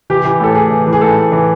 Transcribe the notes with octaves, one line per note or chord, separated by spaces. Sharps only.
E3 G4
E3
A2 A4
A2 G#4
E3
E3
G#4
A2 A4
A2
E3